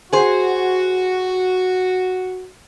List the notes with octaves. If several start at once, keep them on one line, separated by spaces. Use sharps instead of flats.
F#4 G#4 C5